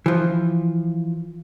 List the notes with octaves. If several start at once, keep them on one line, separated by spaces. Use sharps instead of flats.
E3 F3